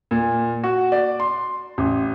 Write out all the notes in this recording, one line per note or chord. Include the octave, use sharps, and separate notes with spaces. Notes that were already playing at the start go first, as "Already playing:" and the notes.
A#2
F#4
D5
C6
A1